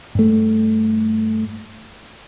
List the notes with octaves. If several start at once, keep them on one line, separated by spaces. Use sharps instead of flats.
G2 A3